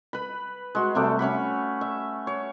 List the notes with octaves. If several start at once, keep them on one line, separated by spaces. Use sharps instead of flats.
B4 B5
G#3 F#4
C3 G3 A3 D6
C#4 C#5 F#5 B5
E5
C#5